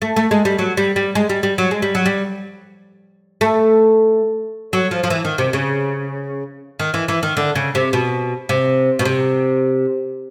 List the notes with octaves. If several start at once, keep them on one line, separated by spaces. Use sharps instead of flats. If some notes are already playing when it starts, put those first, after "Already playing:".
A3
A3
G#3
G3
F#3
G3
G3
G#3
G3
G3
F#3
G#3
G3
F#3
G3
A3
F#3
F3
F3
E3
D#3
C3
C#3
D#3
E3
E3
D#3
D3
C#3
C3
B2
C3
B2
C3